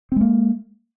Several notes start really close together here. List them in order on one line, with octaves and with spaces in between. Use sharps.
C4 G#3 A#3